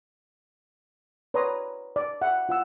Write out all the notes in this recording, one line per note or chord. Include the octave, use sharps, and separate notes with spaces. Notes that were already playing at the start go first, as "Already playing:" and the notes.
B4 C#5 D5 A#5 C6 D#6
D5
E5 F#5
F4 F#5 E6